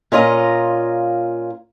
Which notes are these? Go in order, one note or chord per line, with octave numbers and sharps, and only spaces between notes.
A#2 C#4 F4 D#5 A#5